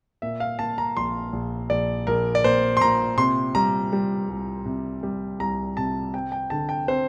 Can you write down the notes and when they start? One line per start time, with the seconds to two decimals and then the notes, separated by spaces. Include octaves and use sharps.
0.22 A#2 E5
0.40 F5
0.59 A#2 A5
0.78 A#5
0.97 A#1 C6
1.33 A#1
1.70 A#1 D5
2.07 A#1 A#4
2.35 D5
2.44 A#2 C5
2.77 C6
2.81 A#2 A#5
3.18 C3 C6
3.55 G3 A#5
3.93 G3
4.29 C2
4.66 C3
5.03 G3
5.39 C2 A#5
5.77 C3 A5
6.14 C4 G5
6.32 G5
6.50 D3 A5
6.69 G5
6.88 C4 C5